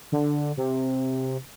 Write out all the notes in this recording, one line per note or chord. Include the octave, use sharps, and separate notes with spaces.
D3
C3